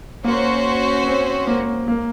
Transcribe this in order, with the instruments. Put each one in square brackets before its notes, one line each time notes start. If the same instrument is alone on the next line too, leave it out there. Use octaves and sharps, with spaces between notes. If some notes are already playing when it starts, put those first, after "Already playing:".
[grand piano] A#3 [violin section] C#4 F#4 C5
[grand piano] C4
A#3
A#3